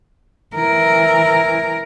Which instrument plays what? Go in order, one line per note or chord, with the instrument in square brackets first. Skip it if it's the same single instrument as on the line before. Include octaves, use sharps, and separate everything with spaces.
[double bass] E3 [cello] A#4